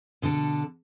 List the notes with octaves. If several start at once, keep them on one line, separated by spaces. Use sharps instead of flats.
B2 D3 D4 A4